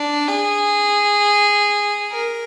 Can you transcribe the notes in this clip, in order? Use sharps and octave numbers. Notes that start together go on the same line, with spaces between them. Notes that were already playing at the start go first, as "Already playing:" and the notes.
Already playing: D4
G#4
A#4